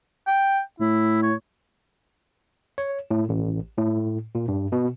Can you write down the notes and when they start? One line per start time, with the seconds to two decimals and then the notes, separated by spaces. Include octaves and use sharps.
0.27 G5
0.80 A2 E4
1.23 C#5
2.78 C#5
3.11 A2
3.29 A1
3.77 A2
4.35 A#2
4.48 G2
4.72 B2